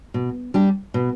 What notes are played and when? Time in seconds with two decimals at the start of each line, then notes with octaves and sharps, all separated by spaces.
0.14 B2
0.54 G3 D4 G4
0.94 B2